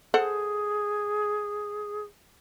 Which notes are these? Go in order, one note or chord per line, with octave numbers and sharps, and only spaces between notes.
G#4 A4 C5 F#5